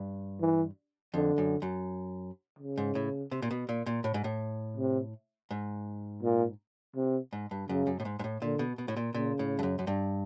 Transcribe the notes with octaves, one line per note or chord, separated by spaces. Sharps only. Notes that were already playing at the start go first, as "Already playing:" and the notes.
Already playing: G2
E3
F2 D3
F#2
F#2
C#3
G#2
A2
C3
A#2
B2
A#2
A#2
A2
G#2
A2
C3
G#2
A#2
C3
G#2
G2
F#2 C#3
F#2
A2
G#2
G#2
A2
A#2 D3
B2
B2
A2
A#2
A#2 C#3
A2
G2
F#2
F#2
G2